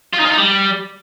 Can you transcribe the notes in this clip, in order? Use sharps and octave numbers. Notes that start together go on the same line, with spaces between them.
F4
D#4
F4
D#4
G3